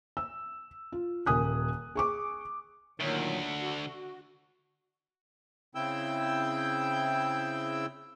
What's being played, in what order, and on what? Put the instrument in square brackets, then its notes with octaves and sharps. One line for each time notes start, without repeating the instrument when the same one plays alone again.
[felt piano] E6
F4
D#1 A#4 G#5 D#6 F#6
G#4 C#6 D6
[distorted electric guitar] D2 [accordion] A#2 D#3 F#3
[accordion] F#4
C#3 C4 E4 G5 E6 G6